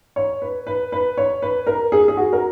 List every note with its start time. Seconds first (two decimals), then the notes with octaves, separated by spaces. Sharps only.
0.16 C#5
0.42 B4
0.67 B4
0.92 B4
1.17 C#5
1.42 B4
1.67 A#4
1.92 G#4
2.08 G#4
2.17 F#4
2.33 A#4